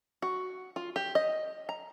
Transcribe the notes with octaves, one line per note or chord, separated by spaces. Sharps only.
F#4
F4
G4
D#5
A#5